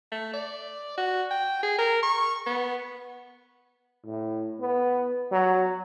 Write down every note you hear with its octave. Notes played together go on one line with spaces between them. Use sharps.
A3
D5
F#4
G5
G#4
A#4
C#6
B3
A2
B3
F#3